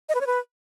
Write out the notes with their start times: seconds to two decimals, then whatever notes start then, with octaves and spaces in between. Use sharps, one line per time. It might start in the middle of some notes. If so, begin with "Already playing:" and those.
0.09 D#5
0.15 B4
0.21 C#5
0.27 B4